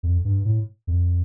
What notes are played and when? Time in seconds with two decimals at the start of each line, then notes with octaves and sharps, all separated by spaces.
0.03 F2
0.25 G2
0.45 A2
0.87 F2